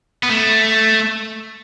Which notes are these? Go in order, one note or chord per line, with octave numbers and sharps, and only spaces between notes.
B3
A3